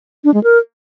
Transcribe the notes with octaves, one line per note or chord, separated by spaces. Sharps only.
D4
G#3
A#4